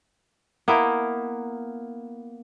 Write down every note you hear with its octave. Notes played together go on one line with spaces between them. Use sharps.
A#3 B3 E4 A#4